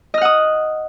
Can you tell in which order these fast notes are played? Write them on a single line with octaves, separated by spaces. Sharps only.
D#5 F6 F#5 D#6